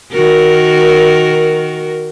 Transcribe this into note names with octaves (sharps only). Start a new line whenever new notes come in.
D#3 F#4 A#4